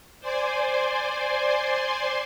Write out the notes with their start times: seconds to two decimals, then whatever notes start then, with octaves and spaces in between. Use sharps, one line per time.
0.20 C5 D5 G#5 C6